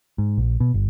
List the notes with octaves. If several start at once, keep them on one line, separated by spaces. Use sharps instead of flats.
G#2
A#1
B2
G1